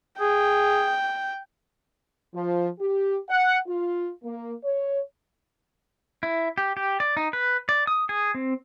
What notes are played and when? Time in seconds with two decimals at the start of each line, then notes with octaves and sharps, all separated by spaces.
0.21 G#4 G5
2.34 F3
2.80 G4
3.29 F#5
3.67 F4
4.24 A#3
4.64 C#5
6.23 E4
6.58 G4
6.77 G4
7.00 D5
7.17 D#4
7.33 B4
7.69 D5
7.87 D#6
8.09 G#4
8.35 C4